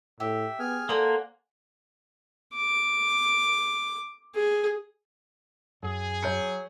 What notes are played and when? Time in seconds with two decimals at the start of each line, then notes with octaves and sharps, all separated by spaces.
0.20 A2 G4 E5
0.59 B3 G#4 G#5 F6
0.89 A#3 A4 C5 D5 F#5 G#5
2.55 D6
4.35 G#4
5.83 F#2 G#4
6.23 F#3 C#5 G6 C#7